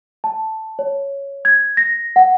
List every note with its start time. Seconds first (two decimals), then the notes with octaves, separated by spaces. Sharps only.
0.24 A5
0.79 C#5
1.45 G#6
1.77 A#6
2.16 F#5